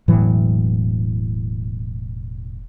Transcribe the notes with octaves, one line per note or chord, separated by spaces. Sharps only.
E1 A2 E3 F#3